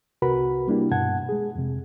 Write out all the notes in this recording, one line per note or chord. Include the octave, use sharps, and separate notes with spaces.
C2 C3 F#4 A#4 B4 B5
G3 A#3 D4 E4 G4
G2 B2 F#5 A5 G#6
G#3 G#4
F2 C3